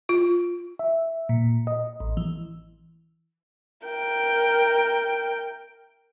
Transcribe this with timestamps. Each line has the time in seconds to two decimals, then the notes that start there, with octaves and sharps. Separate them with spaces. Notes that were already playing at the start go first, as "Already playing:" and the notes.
0.09 F4
0.79 E5
1.29 A#2
1.67 D#5
2.00 A1
2.17 E3
3.87 A#4 G5